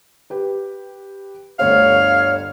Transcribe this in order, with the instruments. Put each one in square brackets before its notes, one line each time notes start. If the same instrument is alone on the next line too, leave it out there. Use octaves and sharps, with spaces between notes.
[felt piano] G4 B4
[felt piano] G1 D2 C5 [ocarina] C#5 [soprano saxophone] F5